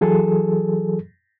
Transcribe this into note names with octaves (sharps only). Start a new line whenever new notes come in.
E3 F#3 G#4 A4